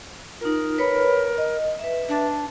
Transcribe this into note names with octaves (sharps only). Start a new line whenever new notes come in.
D#4 F4 A#4
B4 C#5 B5
D#5
B4 E5
D4